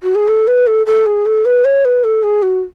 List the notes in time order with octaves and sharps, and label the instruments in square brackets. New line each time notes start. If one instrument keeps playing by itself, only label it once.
[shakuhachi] F#4
G#4
A4
B4
A4
A4
G#4
A4
B4
C#5
B4
A4
G#4
F#4